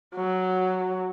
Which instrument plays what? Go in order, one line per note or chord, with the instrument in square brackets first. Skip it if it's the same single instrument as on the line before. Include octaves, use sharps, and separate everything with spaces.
[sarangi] F#3